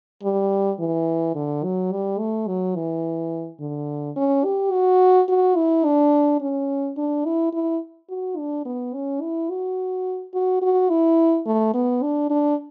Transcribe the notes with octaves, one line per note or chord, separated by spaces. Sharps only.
G3
E3
D3
F#3
G3
A3
F#3
E3
D3
C#4
G4
F#4
F#4
E4
D4
C#4
D4
E4
E4
F#4
D4
B3
C#4
E4
F#4
F#4
F#4
E4
A3
B3
D4
D4